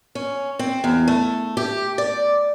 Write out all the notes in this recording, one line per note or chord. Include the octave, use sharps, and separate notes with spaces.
C#4
C4
E2
A3
G4
D5